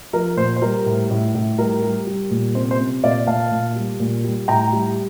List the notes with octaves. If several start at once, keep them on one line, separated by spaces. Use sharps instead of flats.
F3 A#4
A#2 C5
C5
G3 A#4
A2
A2
A2
G3 A#4
G3
G3
A#2
C3 C5
C5
C3
A#2 D5 F5
A#2 F5 A5
A#2
G3
A#2
G3
A2 G5 A#5
G3